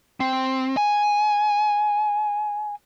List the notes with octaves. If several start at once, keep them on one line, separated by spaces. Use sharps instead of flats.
C4
G#5